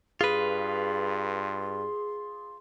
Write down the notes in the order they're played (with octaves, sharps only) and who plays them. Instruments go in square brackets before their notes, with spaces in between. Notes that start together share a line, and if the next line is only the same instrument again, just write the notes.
[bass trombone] G2 [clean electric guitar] F4 B4 [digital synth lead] G#4 [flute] C6